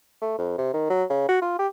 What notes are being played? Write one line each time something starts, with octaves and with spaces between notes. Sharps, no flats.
A3
F2
C3
D#3
F#3
C#3
F#4
F4
G4